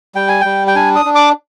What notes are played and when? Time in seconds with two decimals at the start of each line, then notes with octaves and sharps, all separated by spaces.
0.15 G3 G5
0.29 G#5
0.41 G3 G5
0.67 G5
0.75 D4 G#5
0.96 D#6
1.05 D4
1.15 D6